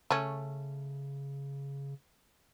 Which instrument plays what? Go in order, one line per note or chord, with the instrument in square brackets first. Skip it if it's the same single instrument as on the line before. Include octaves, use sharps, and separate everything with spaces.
[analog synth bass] C#3 [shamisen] A3 C#4